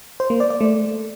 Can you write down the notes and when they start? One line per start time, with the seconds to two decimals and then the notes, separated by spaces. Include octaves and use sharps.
0.20 C5
0.30 A#3
0.40 D5
0.50 D5
0.61 A3